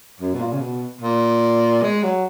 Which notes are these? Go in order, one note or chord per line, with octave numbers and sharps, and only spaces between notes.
F#2
B2
A#2
C#3
B2
A#2
G#3
F#3